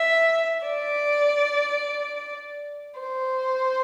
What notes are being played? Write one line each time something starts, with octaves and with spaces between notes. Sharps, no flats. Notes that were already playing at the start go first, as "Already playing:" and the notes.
Already playing: E5
D5
C5